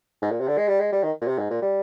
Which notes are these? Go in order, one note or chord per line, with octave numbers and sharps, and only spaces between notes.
G#2
A#2
C3
D3
G#3
G3
G#3
G3
D#3
A#2
C3
G#2
A#2
G3